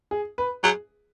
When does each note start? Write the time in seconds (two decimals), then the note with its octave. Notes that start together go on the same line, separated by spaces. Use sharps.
0.11 G#4
0.38 B4
0.63 F#3 G#4